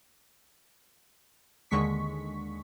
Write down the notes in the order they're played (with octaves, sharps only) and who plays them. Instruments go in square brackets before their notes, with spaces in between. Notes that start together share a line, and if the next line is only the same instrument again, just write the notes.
[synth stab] D#2 D3 G#3 C#6 B6